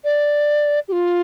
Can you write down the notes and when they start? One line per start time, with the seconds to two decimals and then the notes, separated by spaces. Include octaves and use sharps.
0.04 D5
0.88 G4
0.92 F4